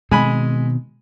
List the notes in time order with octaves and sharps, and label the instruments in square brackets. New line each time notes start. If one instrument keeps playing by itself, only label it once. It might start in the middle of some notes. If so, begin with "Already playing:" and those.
[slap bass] B2 D#3 C4 [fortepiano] G#3 G#5 B5